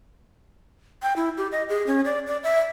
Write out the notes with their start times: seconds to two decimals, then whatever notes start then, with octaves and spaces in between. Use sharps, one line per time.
1.03 G5
1.16 E4
1.37 G4
1.52 D#5
1.69 G#4
1.87 C#4
2.05 D5
2.27 D5
2.43 E5